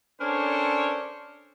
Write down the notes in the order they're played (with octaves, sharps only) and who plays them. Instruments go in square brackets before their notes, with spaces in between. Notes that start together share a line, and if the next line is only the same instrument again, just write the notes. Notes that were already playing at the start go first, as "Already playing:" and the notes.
[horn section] C#4 D4 A4 A#4 C5 C#5